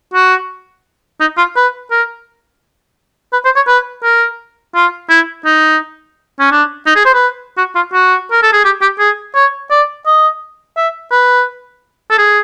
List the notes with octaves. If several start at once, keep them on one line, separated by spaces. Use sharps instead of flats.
F#4
D#4
F4
B4
A#4
B4
C5
C#5
B4
A#4
F4
E4
D#4
C#4
D4
D#4
G#4
C5
B4
F#4
F4
F#4
A#4
A4
G#4
G4
G4
G#4
C#5
D5
D#5
E5
B4
A4
G#4